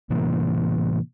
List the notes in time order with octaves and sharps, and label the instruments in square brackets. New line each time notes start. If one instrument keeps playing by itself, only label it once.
[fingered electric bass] A2 C3 E3 A#3